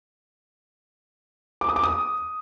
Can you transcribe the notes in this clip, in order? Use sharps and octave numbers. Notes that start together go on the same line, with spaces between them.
D6
D#6
D6
D#6